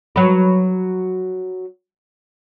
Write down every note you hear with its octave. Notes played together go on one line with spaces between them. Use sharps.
F#3 B4